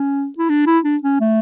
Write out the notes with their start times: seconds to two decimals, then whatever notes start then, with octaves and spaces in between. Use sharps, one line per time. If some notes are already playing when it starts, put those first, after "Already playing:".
Already playing: C#4
0.38 E4
0.49 D4
0.67 E4
0.84 D4
1.03 C#4
1.20 A3